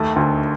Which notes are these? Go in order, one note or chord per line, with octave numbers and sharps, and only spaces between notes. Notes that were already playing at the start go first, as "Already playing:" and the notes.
Already playing: D#2 A3
D2